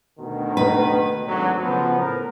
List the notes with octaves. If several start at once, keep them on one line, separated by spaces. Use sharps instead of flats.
D2 B2 D#3
B4
G#1 D2 F#3
C#3 F3 B3
A2 A#4